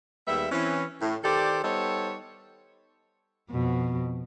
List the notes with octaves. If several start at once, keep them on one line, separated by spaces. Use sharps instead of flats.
D#2 G3 G#3 B3 E5
E3 C4 C#4
A2
D#3 G4 A4 C5 D5
G3 B3 D#4 A4 C5 C#5
F2 B2